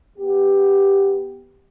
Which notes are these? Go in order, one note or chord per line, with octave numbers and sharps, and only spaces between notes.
B3 G4